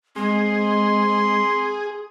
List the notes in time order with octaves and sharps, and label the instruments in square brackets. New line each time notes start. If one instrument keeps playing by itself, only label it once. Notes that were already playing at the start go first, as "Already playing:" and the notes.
[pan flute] G#3 [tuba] C4 [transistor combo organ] G#4 [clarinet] C6